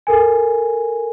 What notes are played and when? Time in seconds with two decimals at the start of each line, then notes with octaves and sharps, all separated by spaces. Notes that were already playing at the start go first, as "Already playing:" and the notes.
0.07 A4 A#4 G#5